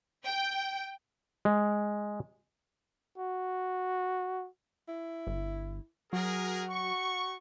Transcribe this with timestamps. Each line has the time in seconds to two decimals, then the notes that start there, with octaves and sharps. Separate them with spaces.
0.24 G5
1.45 G#3
3.18 F#4
4.88 E4
5.27 G1
6.13 F#3 F#4 G#4 A#4
6.70 C#6